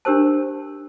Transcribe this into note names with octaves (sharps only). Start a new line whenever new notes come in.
D4 G4 A#4 C5 A5